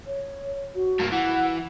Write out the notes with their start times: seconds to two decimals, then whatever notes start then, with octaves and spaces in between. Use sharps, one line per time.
0.06 C#5
0.75 F#4
0.99 G2 A#3
1.12 E3 F#5